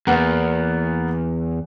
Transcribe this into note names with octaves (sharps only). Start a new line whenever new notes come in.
E2 A#3 B3 F#5